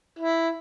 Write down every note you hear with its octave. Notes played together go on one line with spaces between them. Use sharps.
E4